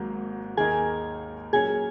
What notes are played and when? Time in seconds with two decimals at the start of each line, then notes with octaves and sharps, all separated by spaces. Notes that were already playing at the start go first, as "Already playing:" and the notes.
Already playing: G#1 G#2 F#3 A#3
0.57 D#2 D#3 A#3 D#4 G#4 A#4 G#5
1.53 A#2 F#3 C#4 G#4 A#4 C#5 G#5